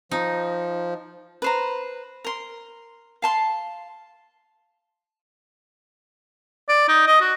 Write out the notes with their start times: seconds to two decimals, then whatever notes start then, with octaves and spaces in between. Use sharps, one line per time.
0.11 F3 D#4
1.42 B4 C5 A#5
2.24 A#4 C6
3.22 F5 A5 C6
6.69 D5
6.89 D#4
7.07 D#5
7.21 F#4